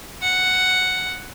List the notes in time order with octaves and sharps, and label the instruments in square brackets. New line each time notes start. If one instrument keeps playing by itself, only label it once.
[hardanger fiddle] F#5